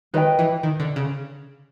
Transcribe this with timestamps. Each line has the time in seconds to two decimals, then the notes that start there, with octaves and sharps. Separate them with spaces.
0.14 D#3 B4 D#5 G5
0.39 E3
0.63 D#3
0.80 D3
0.96 C#3